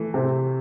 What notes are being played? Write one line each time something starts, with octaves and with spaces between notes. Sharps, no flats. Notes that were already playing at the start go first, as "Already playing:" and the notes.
Already playing: E3 A3
C3